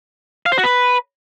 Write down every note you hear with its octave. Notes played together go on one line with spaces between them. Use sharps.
F5
C5
F#4
B4